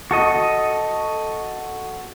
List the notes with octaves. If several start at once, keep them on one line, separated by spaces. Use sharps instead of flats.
F#4 A4 D#5